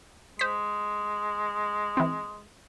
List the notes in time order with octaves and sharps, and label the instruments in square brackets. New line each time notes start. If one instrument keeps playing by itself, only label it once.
[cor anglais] G#3 [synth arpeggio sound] C5 B6
[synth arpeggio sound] E3 C4